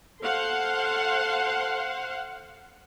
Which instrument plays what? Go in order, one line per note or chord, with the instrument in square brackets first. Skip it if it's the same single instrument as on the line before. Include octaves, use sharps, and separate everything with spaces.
[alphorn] A4 [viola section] C5 F5 F#5